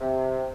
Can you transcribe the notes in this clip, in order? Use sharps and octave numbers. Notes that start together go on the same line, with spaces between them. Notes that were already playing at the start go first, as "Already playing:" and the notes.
C3